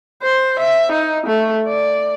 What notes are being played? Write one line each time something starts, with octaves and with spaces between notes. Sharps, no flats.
C5
E5
D#4
A3
D5